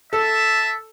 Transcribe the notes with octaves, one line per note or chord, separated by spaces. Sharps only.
A4 E5 A5